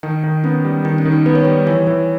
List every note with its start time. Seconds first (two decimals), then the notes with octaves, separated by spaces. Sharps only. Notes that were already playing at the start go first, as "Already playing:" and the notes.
0.03 D#3 D#4
0.24 D#3
0.44 B3 C#4
0.65 G3
0.85 D#3 D#4
0.98 C#4
1.05 D#3
1.12 D#4
1.26 B3 B4
1.35 C#5
1.45 G3 B4
1.67 E3 C#5
1.87 E3